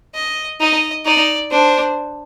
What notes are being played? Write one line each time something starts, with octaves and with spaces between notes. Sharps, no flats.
D#5
D#4 D#5
D#4 D5
D4 C5